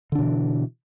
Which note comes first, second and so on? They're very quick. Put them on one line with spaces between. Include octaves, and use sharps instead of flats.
D3 D4 B2 E3